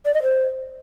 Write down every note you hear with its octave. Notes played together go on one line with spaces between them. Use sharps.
D5
D#5
C5